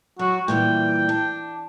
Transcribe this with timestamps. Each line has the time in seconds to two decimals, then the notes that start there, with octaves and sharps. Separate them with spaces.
0.19 F#3 F#4
0.48 A#2 E3 G3 G5
1.09 D4